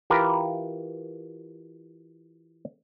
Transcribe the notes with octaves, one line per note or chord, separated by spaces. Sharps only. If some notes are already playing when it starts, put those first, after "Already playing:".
E3 F4 G4 A#4 B4